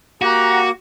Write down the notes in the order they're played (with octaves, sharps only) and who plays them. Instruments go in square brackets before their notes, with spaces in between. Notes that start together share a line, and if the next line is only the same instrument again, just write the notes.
[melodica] A#3 [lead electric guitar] F#4 [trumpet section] G4 F#5 A#5